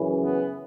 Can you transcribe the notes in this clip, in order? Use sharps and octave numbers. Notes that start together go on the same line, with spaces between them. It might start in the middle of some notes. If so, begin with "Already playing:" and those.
Already playing: F#2 C#3 E3
B3